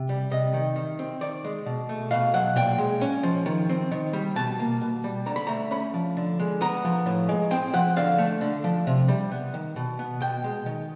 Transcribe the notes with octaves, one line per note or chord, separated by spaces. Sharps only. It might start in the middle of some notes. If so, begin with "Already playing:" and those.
Already playing: C3
G3
C3 D#5
D#3
D#3
C4
D#3 D5
G#3
B2
A3
B2 F5
F#3 F#5
A#2 G5
G#3
C#4
F3
D#3
C4
D#3
G3
B2 A5
A#3
B2
G3
D3 A#5
B5
A3 A#5
C#4 B5
F3
D3
G#3
B3 A#5
F3
A2
G#3
C4 G5
F3 F#5
D3 F5
A3
D3
F3
C3
G3
B3
D#3
B2
B3
B2 G5
G#3
D#3